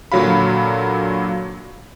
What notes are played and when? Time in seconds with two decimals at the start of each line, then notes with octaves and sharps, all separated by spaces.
0.12 A#2 D3 F#3 F#4 F5 B5